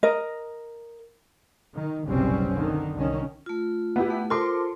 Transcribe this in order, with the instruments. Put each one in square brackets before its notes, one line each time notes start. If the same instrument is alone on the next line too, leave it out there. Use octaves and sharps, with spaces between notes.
[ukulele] A#4 D#5
[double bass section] D#3
F#1 B1 C3 G3 C4 C#4
D3 D#3
C2 D#3 C#4
[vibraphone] A3 F4
[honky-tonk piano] B3 E4 G4
[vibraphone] A3
[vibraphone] F4 A#4 C5 [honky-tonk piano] A4 C6 D6